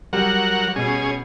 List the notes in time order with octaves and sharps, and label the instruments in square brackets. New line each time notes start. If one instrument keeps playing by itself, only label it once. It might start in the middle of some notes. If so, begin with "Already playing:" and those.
[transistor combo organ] F#3 A#4 F#5 [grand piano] G3
[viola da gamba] B2 [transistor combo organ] C#4 G#4